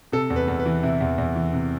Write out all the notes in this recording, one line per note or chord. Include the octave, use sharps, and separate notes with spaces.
C3 A4
E2
B4
E2
B4
E3
C3 E4
E2
E2
E3
C3